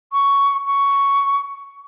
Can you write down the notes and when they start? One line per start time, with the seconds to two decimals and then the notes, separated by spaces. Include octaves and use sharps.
0.13 C#6
0.67 C#6